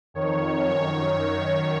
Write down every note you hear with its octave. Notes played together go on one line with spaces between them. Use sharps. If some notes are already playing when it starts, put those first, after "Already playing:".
F2 D#3 C#5
F#2 D#3 C#5